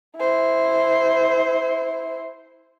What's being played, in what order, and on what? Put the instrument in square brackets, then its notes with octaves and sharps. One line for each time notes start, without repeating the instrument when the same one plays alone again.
[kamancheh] E4 C5